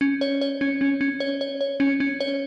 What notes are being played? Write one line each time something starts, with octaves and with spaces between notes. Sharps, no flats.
C#4
C#5
C#5
C#4
C#4
C#4
C#5
C#5
C#5
C#4
C#4
C#5